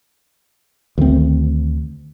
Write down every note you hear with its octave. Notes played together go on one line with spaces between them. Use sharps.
D2 D#3 C4